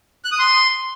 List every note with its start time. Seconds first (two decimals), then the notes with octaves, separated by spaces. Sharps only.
0.24 F#6
0.32 D#6
0.39 C6